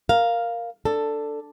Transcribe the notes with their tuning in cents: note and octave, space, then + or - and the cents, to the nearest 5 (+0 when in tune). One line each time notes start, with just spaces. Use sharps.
A#4 +0 F5 +0
D4 +0 A4 +10